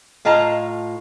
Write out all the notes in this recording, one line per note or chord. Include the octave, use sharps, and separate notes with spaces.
A2 F4 D#5 A5 A#5